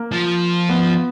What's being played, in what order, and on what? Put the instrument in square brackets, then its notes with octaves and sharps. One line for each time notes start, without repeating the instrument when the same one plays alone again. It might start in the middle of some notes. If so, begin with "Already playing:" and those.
Already playing: [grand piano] A#3
[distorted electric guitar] F3
[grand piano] B3